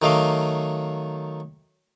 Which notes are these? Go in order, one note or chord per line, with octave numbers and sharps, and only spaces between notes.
D#3 F#3 A3 D#5 F5 D6